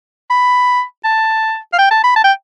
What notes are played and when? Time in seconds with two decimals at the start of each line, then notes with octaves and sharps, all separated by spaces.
0.30 B5
1.05 A5
1.73 F5
1.78 G5
1.91 A5
2.04 B5
2.16 A5
2.24 G5